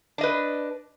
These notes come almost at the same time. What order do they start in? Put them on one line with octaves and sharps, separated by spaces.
D4 D#5 B4